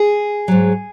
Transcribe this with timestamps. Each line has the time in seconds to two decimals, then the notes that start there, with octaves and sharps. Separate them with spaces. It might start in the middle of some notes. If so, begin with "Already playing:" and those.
Already playing: G#4
0.48 G#2 F#3